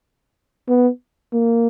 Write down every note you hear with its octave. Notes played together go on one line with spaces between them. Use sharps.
B3
A#3